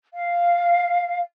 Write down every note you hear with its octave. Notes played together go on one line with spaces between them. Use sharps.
F5